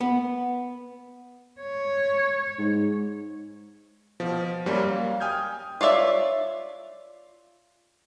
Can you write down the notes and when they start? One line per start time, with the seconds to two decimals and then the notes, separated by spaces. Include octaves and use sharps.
0.01 B3
1.60 C#5
2.59 G#2
4.20 B2 F3
4.66 F#2 G3 A#3 C#4
4.87 F5
5.20 G5 G#5 D#6 F6 G6 G#6
5.81 F4 C#5 D5 E5